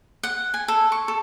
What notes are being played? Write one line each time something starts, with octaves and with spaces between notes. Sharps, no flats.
F#5
G#5
A4
C#6
A4